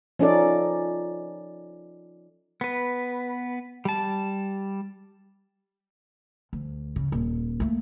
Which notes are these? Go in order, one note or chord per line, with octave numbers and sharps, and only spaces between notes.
F3 C#4 D#4 A4 D5
B3 B4
G3 A5
D2
C#3
D#1
A3 A#3